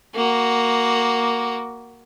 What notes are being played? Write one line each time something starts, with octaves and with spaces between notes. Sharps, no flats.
A#3 F#4